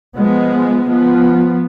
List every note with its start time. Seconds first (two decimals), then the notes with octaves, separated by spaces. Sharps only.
0.15 F3 G#3 B3
0.88 F3 B3